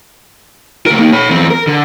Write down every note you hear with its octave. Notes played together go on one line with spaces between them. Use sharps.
D2 A#4
A#3 D#4
C#5 B5
E2 C4
A#4
D3